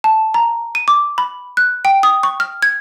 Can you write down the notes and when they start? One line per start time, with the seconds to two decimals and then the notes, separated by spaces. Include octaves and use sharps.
0.04 A5
0.34 A#5
0.75 D#7
0.88 D6
1.18 B5
1.57 F#6
1.85 G5
2.03 D#6
2.23 C#6
2.40 F6
2.62 G#6